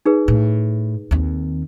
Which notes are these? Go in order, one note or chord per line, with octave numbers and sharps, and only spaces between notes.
D#4 G#4 B4
A2
D#2 C4